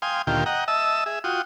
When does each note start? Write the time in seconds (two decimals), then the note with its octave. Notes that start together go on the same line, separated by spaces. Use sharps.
0.02 F5 G5 G#5 C6 D#6
0.27 D2 A#2 D#3 F4 G4 G5
0.46 D#5 F#5 G5 A#5
0.68 D#5 E5 A5 E6
1.06 G#4 E5
1.24 F4 F#4 G5 D#6